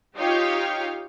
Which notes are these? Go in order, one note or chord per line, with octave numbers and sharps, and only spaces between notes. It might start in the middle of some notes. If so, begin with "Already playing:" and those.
D#4 F4 G4 C#5 F5 G5